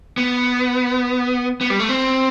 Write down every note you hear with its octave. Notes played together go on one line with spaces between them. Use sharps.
B3
B3
G3
A3
C4